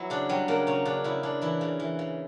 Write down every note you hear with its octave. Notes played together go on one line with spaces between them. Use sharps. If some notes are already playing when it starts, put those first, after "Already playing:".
Already playing: F#3 B3 E4
C#3 D4
F#3 G3
C#3 A#3
C#3 C#4
C#3 D4
C#3 E4
C#3 D4
E3 E4
C#3
E3
C#3